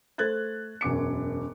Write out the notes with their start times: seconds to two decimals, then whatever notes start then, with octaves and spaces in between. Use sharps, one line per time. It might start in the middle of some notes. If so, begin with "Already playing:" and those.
0.18 A3 A4 C5 F#6 G#6 A6
0.81 E1 F#2 D6 C#7